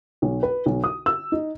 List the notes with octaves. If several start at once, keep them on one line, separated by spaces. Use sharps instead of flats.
B1
B4
B1
D#6
E6
D#4